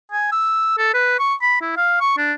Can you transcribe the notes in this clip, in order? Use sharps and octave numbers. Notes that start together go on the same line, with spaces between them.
G#5
E6
A4
B4
C#6
B5
E4
F5
C#6
D4